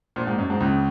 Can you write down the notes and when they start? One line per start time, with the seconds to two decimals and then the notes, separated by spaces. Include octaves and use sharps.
0.16 A#1 A#2
0.27 G#2
0.38 F#2
0.50 G#2
0.60 C#2 C#3